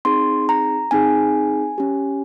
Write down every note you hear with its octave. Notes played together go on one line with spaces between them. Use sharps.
C4 D#4 G#4 C6
A#5
C4 D#4 G#4 G#5
C#4 G4